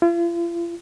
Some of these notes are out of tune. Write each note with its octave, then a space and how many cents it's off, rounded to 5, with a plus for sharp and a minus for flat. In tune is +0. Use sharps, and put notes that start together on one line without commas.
F4 -40